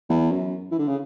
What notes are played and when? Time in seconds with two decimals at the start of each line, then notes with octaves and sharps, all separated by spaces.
0.10 E2
0.31 F#2
0.71 E3
0.79 D3
0.88 C#3